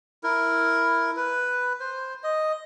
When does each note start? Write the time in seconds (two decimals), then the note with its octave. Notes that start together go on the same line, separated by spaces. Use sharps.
0.24 E4 A#4
1.17 B4
1.80 C5
2.24 D#5